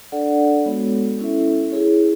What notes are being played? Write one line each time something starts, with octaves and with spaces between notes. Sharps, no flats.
D4 A4 D5 F#5
G#3 B3 F#4 A4 C#5
C#4 E4 A4 E5
E4 G#4 C#5